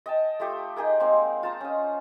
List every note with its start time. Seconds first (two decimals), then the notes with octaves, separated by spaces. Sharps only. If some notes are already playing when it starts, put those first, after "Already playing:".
0.06 D#5 G5 A5
0.40 A3 F4 G4 A4
0.76 D#4 G4 G#4 A#4
1.00 G#3 A#3 C4 C6
1.43 F4 A5 A#5
1.61 C#4 D#5